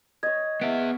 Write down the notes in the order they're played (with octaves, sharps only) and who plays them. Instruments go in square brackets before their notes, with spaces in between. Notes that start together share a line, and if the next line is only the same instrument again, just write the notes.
[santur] C#5 D#5 [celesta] G#6
[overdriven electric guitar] B3 E5 [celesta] D7